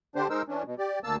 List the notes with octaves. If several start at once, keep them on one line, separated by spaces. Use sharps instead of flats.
D3 D4 G4 C5
G#3 D#4 A#4 C5 E6
E3 C#4 D4
B2
G4 D5
D2 A#3 A5 E6